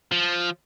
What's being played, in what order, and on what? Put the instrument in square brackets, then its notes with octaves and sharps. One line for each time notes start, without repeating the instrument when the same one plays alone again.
[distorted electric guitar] F3